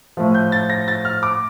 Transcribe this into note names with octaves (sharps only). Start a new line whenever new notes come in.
A2 F3
G6
A6
A#6
A6
F6
D6